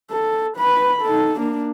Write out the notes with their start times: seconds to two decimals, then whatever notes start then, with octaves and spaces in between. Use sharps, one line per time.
0.11 A4
0.57 B4 B5
1.02 D#4 A4
1.38 A#3 D4